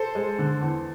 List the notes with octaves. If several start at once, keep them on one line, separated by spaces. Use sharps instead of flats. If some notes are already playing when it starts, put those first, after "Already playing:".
Already playing: A4 C5
G#3
D3
E2